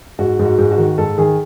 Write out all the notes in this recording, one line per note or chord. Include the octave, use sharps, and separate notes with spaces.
G#2 F#4
G#2
F#4
G#2
F#4
D#3
G#2 A4
D#3 G#4